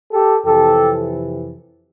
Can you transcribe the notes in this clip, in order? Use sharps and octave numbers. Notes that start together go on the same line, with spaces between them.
G4 A4
F2 C3 E3 G4 A4